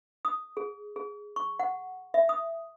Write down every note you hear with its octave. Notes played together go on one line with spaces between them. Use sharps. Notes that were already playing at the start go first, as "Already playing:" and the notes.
D#6
G#4
G#4
C#6
F#5
E5
D#6